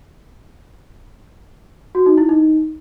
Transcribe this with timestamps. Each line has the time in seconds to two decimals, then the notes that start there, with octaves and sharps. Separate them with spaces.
1.95 F#4
2.06 D#4
2.18 E4
2.29 D#4